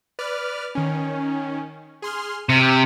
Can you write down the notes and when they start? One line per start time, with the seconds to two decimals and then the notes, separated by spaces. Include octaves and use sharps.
0.19 B4 D5 F6
0.75 D#3 C#4
2.02 G#4 C6 F6
2.49 C3 F6